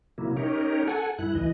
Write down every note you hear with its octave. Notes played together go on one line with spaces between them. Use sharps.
C3 F#3 A#3 E4
C#4 D#4 G4 A#4 C#5
A4 F#5 G#5
G2 E4 F#6
D2 E3 D#5